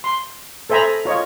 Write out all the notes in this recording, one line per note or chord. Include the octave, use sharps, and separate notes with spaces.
C6
A4 C5 E5 G#5 A#5 B5
F4 C#5 D#5